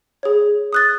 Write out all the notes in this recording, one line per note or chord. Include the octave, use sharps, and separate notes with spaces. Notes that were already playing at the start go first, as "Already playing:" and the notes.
G#4 C#5
D#6 F#6 A6